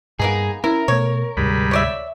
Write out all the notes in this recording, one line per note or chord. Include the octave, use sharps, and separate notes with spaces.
G2 A#3 B3 D#4 G#4
C#4 E4 A#4
B2 A3 C#5
D2 G#2 C3 G3 G#3 B5
C#5 D5 E5